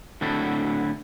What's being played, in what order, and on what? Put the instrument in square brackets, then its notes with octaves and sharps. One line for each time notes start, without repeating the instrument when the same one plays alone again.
[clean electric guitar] A2 D3 C4 D4 E4 F#4